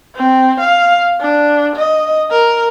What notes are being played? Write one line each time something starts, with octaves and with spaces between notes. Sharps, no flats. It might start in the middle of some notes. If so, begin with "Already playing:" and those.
C4
F5
D4
D#5
A#4